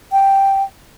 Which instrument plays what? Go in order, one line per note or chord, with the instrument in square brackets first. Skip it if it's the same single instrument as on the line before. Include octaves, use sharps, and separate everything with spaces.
[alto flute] G5